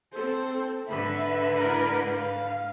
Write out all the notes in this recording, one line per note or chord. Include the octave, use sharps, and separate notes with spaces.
C4 A4 C5
G#2 D3 B4 E5 B5
E4 A#4
F5